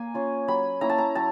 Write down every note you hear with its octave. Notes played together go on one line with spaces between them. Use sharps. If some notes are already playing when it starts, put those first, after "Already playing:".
Already playing: A#3 G#5
C#4 F4
F#3 B5
A#3 C#4 E4 A#5
A5
A#5
F#3 A5